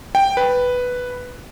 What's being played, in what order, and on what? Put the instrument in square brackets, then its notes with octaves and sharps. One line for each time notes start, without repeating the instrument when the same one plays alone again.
[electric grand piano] G5
B4